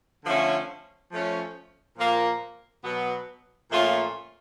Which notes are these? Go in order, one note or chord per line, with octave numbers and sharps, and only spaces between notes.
D3 F3 A3 C#4
F3 A3 C#4
A#2 F3 A#3
B2 F#3 B3
A#2 F3 A3 C#4 F4